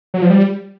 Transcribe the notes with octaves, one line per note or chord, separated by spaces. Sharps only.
F#3
F3
G3